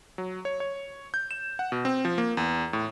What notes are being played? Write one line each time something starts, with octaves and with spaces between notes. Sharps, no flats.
F#3
C#5
C#5
G6
E7
F#5
B2
C4
F3
A#3
E2
A2